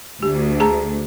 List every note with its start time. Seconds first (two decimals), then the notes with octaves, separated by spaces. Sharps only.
0.23 D2 G4
0.60 G#4 A5 A#5